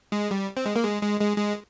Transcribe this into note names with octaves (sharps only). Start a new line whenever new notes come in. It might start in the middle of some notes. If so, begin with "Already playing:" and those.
G#3
G3
C4
G#3
A#3
G#3
G#3
G#3
G#3